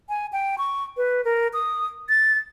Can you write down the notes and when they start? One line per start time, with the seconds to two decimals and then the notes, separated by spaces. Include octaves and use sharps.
0.09 G#5
0.33 G5
0.58 C#6
0.97 B4
1.25 A#4
1.53 D#6
2.09 A6